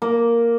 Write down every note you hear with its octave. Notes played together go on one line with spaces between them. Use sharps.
A#3